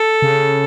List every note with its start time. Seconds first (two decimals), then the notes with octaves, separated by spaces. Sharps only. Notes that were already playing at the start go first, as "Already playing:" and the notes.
Already playing: A4
0.22 C#3